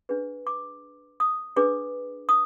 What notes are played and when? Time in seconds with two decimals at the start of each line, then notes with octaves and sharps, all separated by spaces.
0.09 D4 G#4 B4
0.47 D6
1.20 D#6
1.56 D4 G#4 B4 D6
2.29 D#6